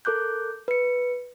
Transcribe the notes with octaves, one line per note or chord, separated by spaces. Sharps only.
A4 A#4 D6 F#6 G6
B4 C#7